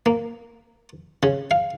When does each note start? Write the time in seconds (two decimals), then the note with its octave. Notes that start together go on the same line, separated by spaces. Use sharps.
0.06 A#3
1.23 C#3
1.51 F5